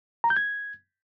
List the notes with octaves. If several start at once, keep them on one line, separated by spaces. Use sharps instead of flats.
A#5
G6
G#6